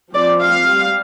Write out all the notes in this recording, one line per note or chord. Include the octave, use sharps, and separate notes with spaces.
F3 C4 D5
F5
G3